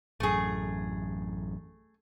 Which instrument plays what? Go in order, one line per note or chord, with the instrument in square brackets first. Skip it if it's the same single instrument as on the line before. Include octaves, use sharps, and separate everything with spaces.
[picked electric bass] A1 F#2 [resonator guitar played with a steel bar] A3 G#4